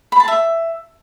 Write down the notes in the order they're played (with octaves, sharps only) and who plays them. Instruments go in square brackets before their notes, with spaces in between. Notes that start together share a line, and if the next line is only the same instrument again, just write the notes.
[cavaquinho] B5
A5
E5